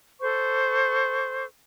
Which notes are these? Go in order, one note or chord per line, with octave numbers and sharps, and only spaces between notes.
A4 C5 C#6